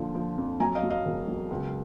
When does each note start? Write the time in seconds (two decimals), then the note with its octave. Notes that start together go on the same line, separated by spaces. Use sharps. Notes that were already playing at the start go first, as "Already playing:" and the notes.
Already playing: A#2 D3 F3
0.15 F3
0.38 F2
0.60 F#3 G#5 A#5
0.75 D#5 F5
0.83 F#3
0.90 D#5 F5
1.05 E1
1.28 F#3
1.51 C#2